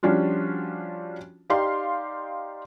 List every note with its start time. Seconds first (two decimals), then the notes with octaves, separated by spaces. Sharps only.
0.03 F3 G3 C#4 D4 F4 F#4
1.50 D#4 G4 D5 F5 C6